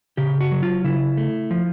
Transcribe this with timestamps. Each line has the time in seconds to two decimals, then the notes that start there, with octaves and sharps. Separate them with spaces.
0.17 C#3 G4
0.41 F#4
0.52 F#3
0.63 F4
0.84 C#3 E4
1.17 A3
1.51 F3